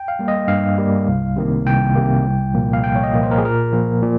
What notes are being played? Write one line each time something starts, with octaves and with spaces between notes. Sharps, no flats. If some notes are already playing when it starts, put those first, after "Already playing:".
Already playing: G5
F5
G3 A#3
D#5
G2 F5
G3 A#3
C2
C3 D#3 A#3
C2 G5
C3 D#3 A#3
C2
A#2 F3 A#3
F5
C2 G5
C#5
D#5
A#2 F3 A#3
C5
A#4
G#4
A#2 A#4
F3 A#3
A#2